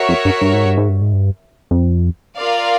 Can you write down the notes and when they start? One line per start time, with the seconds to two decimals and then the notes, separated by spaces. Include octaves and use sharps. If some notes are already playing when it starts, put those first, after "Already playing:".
Already playing: F#4 A#4 C#5 E5
0.09 F2
0.25 G2
0.41 G2
0.54 G#2
0.65 G2
0.77 G#2
0.89 G2
1.02 G#2
1.13 G2
1.71 F2
2.37 F4 A#4 D5 F5